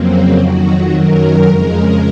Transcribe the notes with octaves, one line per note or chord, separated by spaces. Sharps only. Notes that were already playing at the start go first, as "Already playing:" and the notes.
Already playing: F2 C#3 F#3 A#3 C4
F2 D#3 F#3 F#4
F#2 D#3 F#3 A#4
F2 C#3 G#3 A#4